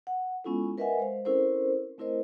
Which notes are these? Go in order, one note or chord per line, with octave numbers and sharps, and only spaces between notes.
F#5
G#3 B3 C#4 E4 F4 A4
A#4 B4 D#5 E5 F#5 G#5
G#3 C5 F5
C4 C#4 E4 A4 A#4 C5
A3 C4 E4 A#4 C5 D#5